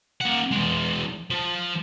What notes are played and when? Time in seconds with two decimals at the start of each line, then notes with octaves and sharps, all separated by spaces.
0.21 A#3 F#5
0.51 E3 G#3
1.30 F3